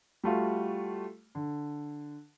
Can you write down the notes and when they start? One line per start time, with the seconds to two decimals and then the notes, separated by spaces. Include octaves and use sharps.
0.24 G3 A3 F4 F#4
1.35 D3